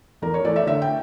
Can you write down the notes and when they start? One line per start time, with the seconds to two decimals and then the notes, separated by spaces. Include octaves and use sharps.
0.22 E2 A#4
0.34 C#5
0.44 E3 A3 D5
0.56 E5
0.66 D3 E5
0.82 G5